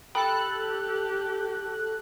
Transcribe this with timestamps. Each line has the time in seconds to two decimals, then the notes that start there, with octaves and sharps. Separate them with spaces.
0.15 G4 A4 G5 B5 D#6 F#6